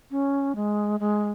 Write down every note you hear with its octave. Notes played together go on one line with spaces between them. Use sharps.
C#4
G#3
G#3